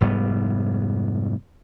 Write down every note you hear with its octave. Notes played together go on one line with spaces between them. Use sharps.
F1 G#2 G3 B3